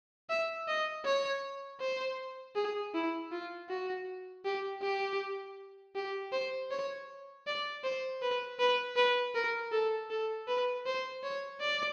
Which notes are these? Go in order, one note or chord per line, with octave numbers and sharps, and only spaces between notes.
E5
D#5
C#5
C5
G#4
E4
F4
F#4
G4
G4
G4
C5
C#5
D5
C5
B4
B4
B4
A#4
A4
A4
B4
C5
C#5
D5